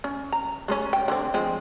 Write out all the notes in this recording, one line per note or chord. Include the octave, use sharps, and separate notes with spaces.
C#4
A#5
G#3 A#3 C#4
G5
D3 C4
F3 G#3 C4